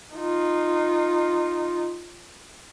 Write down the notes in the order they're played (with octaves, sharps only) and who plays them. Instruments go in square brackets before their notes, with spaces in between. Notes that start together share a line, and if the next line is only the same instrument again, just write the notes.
[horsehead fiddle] D#4 F4